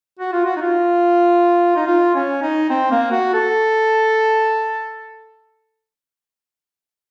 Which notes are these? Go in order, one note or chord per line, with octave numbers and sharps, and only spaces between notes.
F#4
F4
F#4
D#4
F4
D#4
F4
C#4
D#4
C4
A#3
F#4
A4